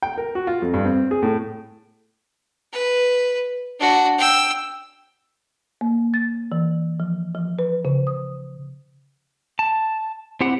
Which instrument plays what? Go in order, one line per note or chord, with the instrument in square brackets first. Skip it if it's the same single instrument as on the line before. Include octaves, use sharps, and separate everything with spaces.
[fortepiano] G5
A#4
F#4
F4
F2
G2
C4
G#4
A2
[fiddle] B4
D4 F#4
G5 E6
[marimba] A#3
A6
E3
F3
F3
B4
C#3
D#6
[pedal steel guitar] A5
C4 E4 G4 F#5